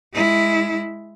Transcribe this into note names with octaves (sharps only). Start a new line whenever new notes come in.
G#3 E4